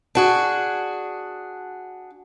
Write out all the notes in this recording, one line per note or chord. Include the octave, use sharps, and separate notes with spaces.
D4 F#4 G#4